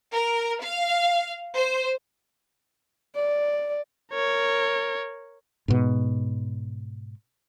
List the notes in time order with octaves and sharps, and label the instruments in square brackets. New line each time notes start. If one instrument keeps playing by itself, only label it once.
[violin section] A#4
F5
C5
[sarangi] D5
[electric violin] A#4 C#5
[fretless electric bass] G#2 B2